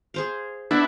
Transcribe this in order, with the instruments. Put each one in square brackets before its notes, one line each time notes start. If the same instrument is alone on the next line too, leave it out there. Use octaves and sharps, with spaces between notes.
[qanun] G#4 C5 F5
[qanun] B3 [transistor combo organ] D4 E4